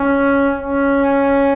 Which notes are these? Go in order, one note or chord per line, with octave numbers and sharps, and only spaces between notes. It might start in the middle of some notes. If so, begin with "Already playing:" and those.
Already playing: C#4
C#4